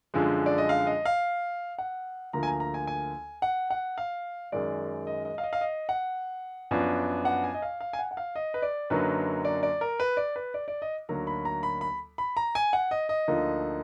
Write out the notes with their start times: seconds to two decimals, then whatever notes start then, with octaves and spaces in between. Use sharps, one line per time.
0.14 F#2 D3 F3 G#3
0.46 D5
0.58 D#5
0.69 F5
0.87 D#5
1.05 F5
1.78 F#5
2.33 D2 D3 F3 A#3 A#5
2.43 G#5
2.47 A#5
2.60 A#5
2.74 G#5
2.87 G#5
3.42 F#5
3.70 F#5
3.98 F5
4.52 F#2 D#3 G#3 D5
5.07 D#5
5.25 D#5
5.38 F5
5.43 D#5
5.53 F5
5.61 D#5
5.89 F#5
6.71 F#2 F3 B3 D4
7.25 F#5
7.44 G#5
7.54 D#5
7.62 F5
7.81 F5
7.93 G#5
7.99 F#5
8.11 F#5
8.17 F5
8.36 D#5
8.54 B4
8.62 D5
8.90 F#2 D3 F#3 A#3 D#4 B4
9.45 D5
9.63 D5
9.81 A#4
10.00 B4
10.17 D5
10.36 B4
10.54 D5
10.68 D5
10.82 D#5
11.09 D2 D3 F#3 A#3 D#4 A#5
11.27 B5
11.45 A#5
11.63 B5
11.81 B5
12.18 B5
12.37 A#5
12.55 G#5
12.73 F#5
12.91 D#5
13.09 D#5
13.28 D2 D3 F3 A#3 D#4